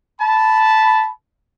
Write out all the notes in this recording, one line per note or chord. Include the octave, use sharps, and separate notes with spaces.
A5 B5